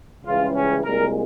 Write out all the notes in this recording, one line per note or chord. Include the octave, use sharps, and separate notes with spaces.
C#2 C#3 E3 G3 F4
C#4
C2 A#2 G#3 A#4